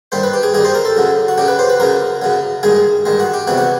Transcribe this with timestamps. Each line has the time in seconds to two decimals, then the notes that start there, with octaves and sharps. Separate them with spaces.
0.12 G2 D#3 G3 C5
0.23 B4
0.33 G4
0.43 G#4
0.54 G2 D#3 G3 G#4
0.64 C5
0.75 A#4
0.85 A4
0.97 F#2 C#3 F#3
1.28 F#4
1.38 F#2 C#3 F#3 G4
1.48 B4
1.59 C5
1.70 B4
1.80 F#2 C#3 F#3 A#4
2.22 F#2 C#3 F#3
2.63 G2 D#3 G#3 G#4
3.06 G2 D#3 G#3
3.20 F#4
3.34 G4
3.47 E2 C3 E3 F#4
3.58 F#4